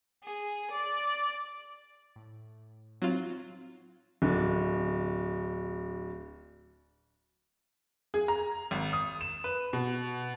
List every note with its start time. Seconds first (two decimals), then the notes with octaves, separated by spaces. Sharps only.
0.23 G#4
0.70 D5
2.16 A2
3.02 F#3 C4 D#4 F4 F#4
4.22 D1 D3 D4
8.14 G#4
8.28 A#5
8.71 G#1
8.93 D#6
9.21 E7
9.44 B4
9.73 B2